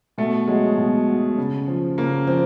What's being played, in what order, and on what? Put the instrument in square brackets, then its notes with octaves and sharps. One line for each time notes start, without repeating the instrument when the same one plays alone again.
[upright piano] B2 A3
F#3 G#3
B2
F#3
C#3
F3
C#3 A#3
F3 C4